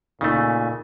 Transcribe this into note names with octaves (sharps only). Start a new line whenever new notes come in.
A#2 C#3 A3 D#4 G#5